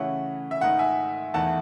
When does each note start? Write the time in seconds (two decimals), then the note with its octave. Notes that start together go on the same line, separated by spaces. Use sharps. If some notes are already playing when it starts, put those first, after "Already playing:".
Already playing: C#3 E3 A3 C#4 E4 F#5
0.51 E5
0.61 G#2 D#3 A3 D#4 F#5
0.79 E5 G#5
1.34 E2 D#3 A3 E4 F#5 A5